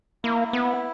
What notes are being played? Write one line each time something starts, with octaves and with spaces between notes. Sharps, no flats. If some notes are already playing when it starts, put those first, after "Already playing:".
A#3 E4
B3